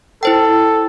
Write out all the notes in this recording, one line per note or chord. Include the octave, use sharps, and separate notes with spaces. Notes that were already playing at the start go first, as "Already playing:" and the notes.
E4 A4 C5 G5